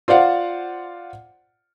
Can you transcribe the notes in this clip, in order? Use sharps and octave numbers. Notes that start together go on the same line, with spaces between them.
F4 C5 D5 F5 F#5